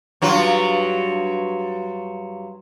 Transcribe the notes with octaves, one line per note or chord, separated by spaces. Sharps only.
G2 F#3 F4